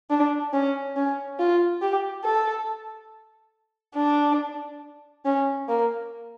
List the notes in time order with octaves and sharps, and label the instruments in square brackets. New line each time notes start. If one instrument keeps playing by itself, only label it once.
[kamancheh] D4
C#4
C#4
F4
G4
A4
D4
C#4
A#3